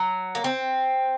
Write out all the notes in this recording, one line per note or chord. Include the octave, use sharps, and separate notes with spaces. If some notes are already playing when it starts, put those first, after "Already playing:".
Already playing: F#3
A#3
C4